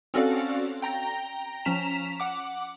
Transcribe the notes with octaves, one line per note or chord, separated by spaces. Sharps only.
C4 C#4 F#4 A4 D5 F5
G5 A#5 A#6
F3 C#4 A#5 B6 E7 F7
F#5 D6